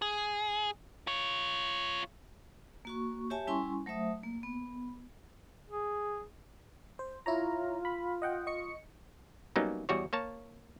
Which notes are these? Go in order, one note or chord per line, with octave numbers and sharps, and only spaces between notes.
G#4
F4 C#5
A#3 F#4 C#6
G4 C#5 E5 G#5 A5
G3 C#4 E4 G#5 C6 C#6
F#3 A3 C5 E5 D#6
A#3
B3
G#4
C5
E4 F4 C#5 A#5
B5
D#5 F#5 G5
D#5 C#6 C#7
F#3 G3 A#3 B3 C#4 D#4
E2 G3 F#4 C#5
A#3 C#5 A5